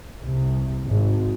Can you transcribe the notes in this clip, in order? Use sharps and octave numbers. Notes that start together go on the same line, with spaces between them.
C2
G#1